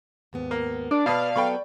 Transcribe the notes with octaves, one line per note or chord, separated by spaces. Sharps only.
D#2 G#2 B3
A#3
D4 D5
B2 B4 C5 F5 A5 D#6
F#3 B3 A4 G5 B5 C#6